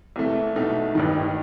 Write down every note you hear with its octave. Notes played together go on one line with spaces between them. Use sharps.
C2 C3 E3 A3
B1 B2 A3 D#4
A1 G2 D#3